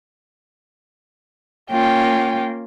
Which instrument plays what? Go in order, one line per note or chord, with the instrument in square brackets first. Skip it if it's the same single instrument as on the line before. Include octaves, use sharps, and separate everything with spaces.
[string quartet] A#3 C#4 F4 [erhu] G5